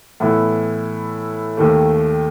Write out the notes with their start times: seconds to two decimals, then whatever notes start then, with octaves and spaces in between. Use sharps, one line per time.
0.20 A2 E3 B3 E4
1.57 D#2 D#3 A3